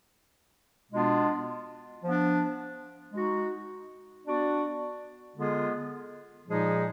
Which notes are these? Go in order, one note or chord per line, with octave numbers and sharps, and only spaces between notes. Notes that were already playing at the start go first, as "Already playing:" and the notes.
B2 G#3 B3 D4 F4
F3 B3 D4
G#3 D#4 F#4
B3 D4 F#4 D5
D3 G#3 B3 F4 G#4
A#2 F3 G#3 D#4 G#4